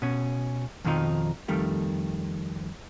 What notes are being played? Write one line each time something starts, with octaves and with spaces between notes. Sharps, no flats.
B2 C#4
F2 B2 D#3 F3 D#4
F2 D#3 G3 A3